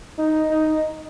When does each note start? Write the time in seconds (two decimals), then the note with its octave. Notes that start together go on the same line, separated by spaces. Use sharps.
0.18 D#4
0.51 D#4